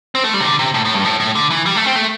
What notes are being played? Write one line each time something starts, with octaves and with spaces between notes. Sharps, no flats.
C4
A3
G3
C3
D3
C3
A2
A2
G2
A2
A2
D3
E3
G3
A3
C4
A3